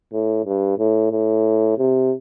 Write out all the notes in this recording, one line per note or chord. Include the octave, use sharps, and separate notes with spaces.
A2
G2
A2
A2
C3